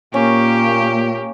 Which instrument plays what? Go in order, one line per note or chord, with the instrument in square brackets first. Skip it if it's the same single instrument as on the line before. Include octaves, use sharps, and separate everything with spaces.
[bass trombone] A#2 [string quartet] A#3 G4 [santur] C#4